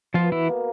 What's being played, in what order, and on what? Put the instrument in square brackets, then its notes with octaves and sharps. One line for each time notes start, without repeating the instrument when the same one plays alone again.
[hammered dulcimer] B2 [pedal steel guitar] F3 F4
[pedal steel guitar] E3 E4
[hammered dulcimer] A#3